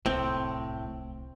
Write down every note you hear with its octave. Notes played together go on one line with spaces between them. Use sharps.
D1 C2 A2 C4